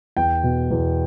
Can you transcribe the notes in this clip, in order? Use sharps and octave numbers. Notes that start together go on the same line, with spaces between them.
E2 G5
B2
E2